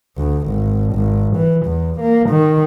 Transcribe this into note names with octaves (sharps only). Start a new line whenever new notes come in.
D2
G#1
G#1
E3
E2
A#3
D#3